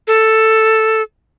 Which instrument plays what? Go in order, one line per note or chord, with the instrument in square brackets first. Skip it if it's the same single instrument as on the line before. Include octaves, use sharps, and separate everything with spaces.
[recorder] A4